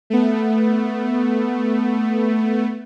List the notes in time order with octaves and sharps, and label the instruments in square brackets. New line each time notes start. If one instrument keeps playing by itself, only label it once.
[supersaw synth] A3 B3